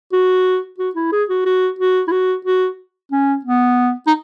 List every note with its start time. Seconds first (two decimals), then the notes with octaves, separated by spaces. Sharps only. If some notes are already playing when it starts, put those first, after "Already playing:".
0.13 F#4
0.79 F#4
0.96 E4
1.12 G#4
1.29 F#4
1.46 F#4
1.79 F#4
2.08 E4
2.12 F#4
2.45 F#4
3.12 C#4
3.45 B3
4.07 D#4